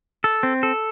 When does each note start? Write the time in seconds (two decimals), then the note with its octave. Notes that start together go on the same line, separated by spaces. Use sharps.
0.24 A4
0.43 C4
0.63 A4